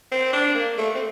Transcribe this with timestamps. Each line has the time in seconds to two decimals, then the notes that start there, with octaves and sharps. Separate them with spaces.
0.12 C4
0.33 D4
0.55 A#3
0.78 A3
0.95 C4